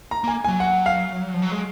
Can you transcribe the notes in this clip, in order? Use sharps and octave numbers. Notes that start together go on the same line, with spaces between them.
A#5
A#3 G#5
F#3 G#5
F#5
F5
F3
F#3
G#3